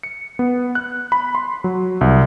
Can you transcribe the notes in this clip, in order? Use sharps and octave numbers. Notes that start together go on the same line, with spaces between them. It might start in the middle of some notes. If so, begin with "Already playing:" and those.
C#7
B3
F#6
B5
C6
F#3
C2